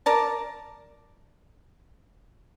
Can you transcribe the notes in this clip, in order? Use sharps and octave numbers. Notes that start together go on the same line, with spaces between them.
A#4 D5 A5